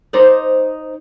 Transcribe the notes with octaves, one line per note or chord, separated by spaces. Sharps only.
D#4 C5 D5